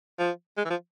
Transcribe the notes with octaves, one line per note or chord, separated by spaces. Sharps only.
F3
G#3
E3
F3